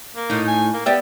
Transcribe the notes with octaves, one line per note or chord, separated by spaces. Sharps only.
A#3
A2 D#4
G#5
A#3
B3 G4 D5 E5